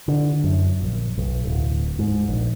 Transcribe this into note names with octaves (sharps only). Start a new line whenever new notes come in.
D3
F#2
A#1
B1
D1
G#2
A#1